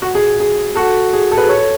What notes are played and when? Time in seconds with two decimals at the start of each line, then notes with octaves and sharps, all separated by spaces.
0.02 F#4
0.15 G#4
0.40 G#4
0.75 F#4 A4
1.13 G#4
1.31 A4
1.37 G#4 B4
1.49 A4 C#5